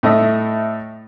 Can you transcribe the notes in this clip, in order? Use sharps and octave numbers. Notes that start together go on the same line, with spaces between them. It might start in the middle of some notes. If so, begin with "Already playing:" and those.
A2 A3 D#5 E5